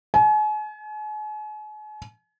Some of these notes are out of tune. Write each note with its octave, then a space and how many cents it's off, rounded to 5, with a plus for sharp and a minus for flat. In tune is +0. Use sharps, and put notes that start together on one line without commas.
G#5 +40